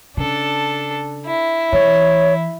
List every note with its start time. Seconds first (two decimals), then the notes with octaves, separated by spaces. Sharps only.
0.17 C#3 D4 A4
1.25 E4
1.73 E3 C#5